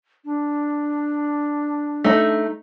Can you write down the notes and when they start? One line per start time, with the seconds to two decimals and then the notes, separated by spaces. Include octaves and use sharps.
0.25 D4
2.04 A3 D#4